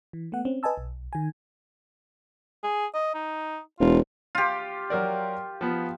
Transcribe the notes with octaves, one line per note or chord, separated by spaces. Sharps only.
E3
A3 B3 F#5
C4 C#4
B4 D#5 G#5 A5 E6
B1
D#3 G#5
G#4
D#5
D#4
E1 F4
F4 G4
F#3 A#4 D5
F3 B3